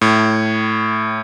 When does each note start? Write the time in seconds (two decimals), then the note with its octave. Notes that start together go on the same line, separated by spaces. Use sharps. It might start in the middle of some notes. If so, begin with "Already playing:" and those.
0.01 A2